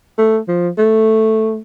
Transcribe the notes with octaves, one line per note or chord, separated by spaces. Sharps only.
A3
F3
A3